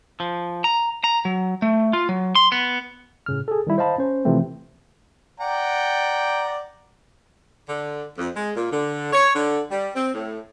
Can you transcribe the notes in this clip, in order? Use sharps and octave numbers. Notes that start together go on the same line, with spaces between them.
F3
A#5
A#5
F#3
A3
F4
F#3
C6
B3
A2 C#3 F6
G#4 A4
D#3 G3 E4
C5 D#5 F5 A5 B5
C#4 C5
C3 E3 F3 A3 C4
D5 F#5 G5 A#5
D3
F2
G#3
A#2
D3
C#5
D3
G3
C4
A2